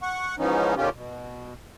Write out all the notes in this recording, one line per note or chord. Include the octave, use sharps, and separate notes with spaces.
F#5 C#6
G#2 E3 F3 B3 C#4 D#4
B2 D3 D#3 C#4 F4 G4
B2